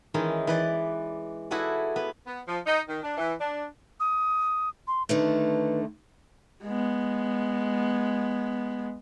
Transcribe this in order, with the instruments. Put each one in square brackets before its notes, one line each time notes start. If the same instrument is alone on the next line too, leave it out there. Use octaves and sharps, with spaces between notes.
[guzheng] D#3 E3 G#3 C#4 D#4
E3 B4 D5
E4 F#4 G#4 A4 B4 D5
B3 B4
[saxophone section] B3
F3
D#4
D#3
D4
E3
D4
[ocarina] D#6
C6
[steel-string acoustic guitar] D3 D#3 A3 [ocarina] B4
[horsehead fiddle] G#3 B3